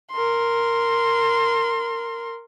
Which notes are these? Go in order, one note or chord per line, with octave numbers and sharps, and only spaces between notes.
A#4 C6